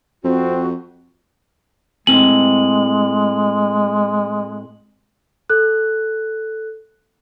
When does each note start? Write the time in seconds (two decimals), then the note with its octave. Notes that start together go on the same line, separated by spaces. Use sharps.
0.24 F2 C4 F#4
2.07 A2 G#3 C4 G#5 F#7
5.50 A4 F#6